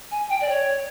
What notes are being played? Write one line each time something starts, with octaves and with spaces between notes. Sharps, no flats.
G#5
G5
D5
C#5